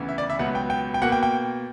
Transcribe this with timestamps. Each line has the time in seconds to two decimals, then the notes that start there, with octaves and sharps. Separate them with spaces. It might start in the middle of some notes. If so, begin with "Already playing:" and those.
Already playing: D2 C#3 E3 B3
0.09 E5
0.18 D5
0.30 E5
0.39 C#2 B2 F#3 B3 F#5
0.55 G5
0.70 G5
0.94 G5
1.02 B2 A#3 F#5
1.12 G5
1.23 G5